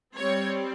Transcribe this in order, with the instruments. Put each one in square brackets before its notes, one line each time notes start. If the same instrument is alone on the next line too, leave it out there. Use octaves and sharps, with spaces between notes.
[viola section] G3 C4 C#5